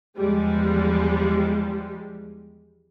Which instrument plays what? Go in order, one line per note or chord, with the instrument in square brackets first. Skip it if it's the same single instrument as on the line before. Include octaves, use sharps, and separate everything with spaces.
[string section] E2 F3 G3 G#3